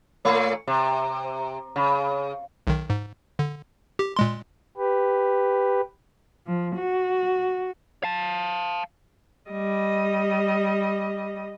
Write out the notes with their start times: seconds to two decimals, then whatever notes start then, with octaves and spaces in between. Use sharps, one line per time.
0.25 A#2 A3 C#5
0.67 C3
1.76 C#3
2.67 B1 D#3
2.90 G#2
3.39 D3
3.99 G4
4.16 A#2 G#3 C6
4.78 G4 B4
6.47 F3
6.76 F#4
8.03 F5 A5
9.51 G3 D#5